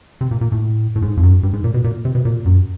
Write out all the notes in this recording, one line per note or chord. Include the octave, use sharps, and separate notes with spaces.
C3
A#2
A#2
A2
A2
G#2
F2
F#2
G2
G#2
A#2
B2
A#2
C3
B2
A#2
F#2